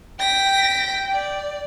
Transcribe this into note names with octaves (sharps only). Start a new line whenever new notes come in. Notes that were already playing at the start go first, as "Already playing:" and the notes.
G5 A#6 B6
D5